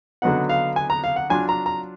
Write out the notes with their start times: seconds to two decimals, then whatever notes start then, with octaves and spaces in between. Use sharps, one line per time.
0.22 D3 F#3 B3 D#4 F#5
0.49 F5
0.76 G#5
0.90 A#5
1.04 F5
1.16 F#5
1.30 F#3 D4 F4 G#5
1.49 A#5
1.66 A#5